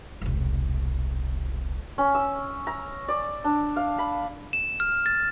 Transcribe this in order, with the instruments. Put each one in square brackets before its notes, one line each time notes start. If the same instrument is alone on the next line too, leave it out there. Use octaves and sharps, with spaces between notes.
[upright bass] E1 C2
[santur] C#4
E6
A#5
D5
D4
F5
B5
[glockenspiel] E7
F6
A6